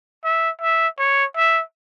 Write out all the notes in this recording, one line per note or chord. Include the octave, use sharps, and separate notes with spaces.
E5
E5
C#5
E5